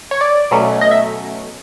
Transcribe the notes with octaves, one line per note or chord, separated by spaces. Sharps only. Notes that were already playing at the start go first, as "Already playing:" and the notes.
C#5
D5
B2 F#3 A3 C#4
D#5
E5